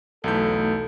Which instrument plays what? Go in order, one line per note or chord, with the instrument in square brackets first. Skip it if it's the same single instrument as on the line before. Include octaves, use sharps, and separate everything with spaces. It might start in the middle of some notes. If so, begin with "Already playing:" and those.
[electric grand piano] B1 E2 G6 [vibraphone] A3 D#4 [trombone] A4